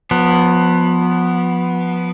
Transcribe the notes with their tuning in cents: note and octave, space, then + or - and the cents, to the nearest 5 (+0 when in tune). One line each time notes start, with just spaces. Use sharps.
F3 +25 B3 +0